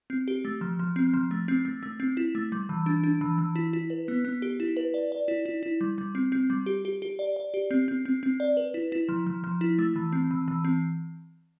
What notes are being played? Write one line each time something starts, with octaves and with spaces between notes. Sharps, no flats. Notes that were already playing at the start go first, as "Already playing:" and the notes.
C4
G4
A3
F3
F3
C4
F3
A3
C4
A3
A3
C4
E4
A3
G3
E3
D4
D4
E3
E3
E4
E4
B4
B3
B3
G4
E4
B4
D5
D5
E4
E4
E4
G3
G3
C4
C4
G3
G4
G4
G4
D5
D5
G4
C4
C4
C4
C4
D5
B4
E4
E4
F3
F3
F3
E4
A3
E3
C4
E3
E3
C4